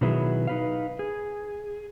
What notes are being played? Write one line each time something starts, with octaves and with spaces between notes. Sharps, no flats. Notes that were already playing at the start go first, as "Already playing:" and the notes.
B2 D#3 F#3 B3 E4 G#4
D#4 B4 F5
G#4